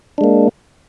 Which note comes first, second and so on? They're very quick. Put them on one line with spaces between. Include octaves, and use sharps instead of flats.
D4 G#3 A#3